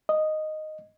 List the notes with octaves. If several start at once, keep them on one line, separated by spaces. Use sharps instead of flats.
D#5